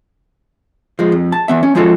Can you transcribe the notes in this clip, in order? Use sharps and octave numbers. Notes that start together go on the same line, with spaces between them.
F3 G#3
F2
A5
E3 B3 E5
C#4
F3 G#3 D#4 F4 F#4 A4